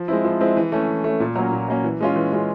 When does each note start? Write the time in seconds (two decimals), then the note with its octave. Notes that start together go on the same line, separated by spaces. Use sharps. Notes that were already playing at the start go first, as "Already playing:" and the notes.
Already playing: F3
0.08 G#3 C4 E4
0.25 F3
0.40 G#3 C4 E4
0.57 E3
0.72 A3 C#4
0.88 E3
1.04 A3 C#4
1.20 A#2
1.36 F#3 A#3 C#4
1.52 A#2
1.68 F#3 A#3 C#4
1.84 E3
2.01 G#3 C#4 F4
2.16 E3
2.32 G#3 C#4 F4